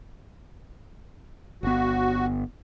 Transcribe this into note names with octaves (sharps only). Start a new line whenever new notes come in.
G1 B3 F#4